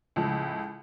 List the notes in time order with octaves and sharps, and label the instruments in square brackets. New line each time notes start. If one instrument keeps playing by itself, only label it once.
[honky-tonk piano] C#2 A2 F3